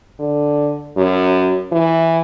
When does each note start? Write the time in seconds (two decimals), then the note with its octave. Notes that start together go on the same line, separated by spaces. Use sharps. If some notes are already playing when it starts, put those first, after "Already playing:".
0.20 D3
0.97 F#2
1.72 E3